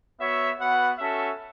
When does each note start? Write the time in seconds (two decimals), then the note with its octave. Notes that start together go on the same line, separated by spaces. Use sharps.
0.19 B3 F#4 C#5 E5
0.59 B3 F#4 B4 F#5
0.98 C#4 F#4 A4 E5